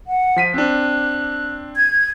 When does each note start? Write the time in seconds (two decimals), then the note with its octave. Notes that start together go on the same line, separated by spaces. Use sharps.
0.07 F#5
0.36 F3 B6 D#7
0.54 C4 D4 F#6
1.76 G#6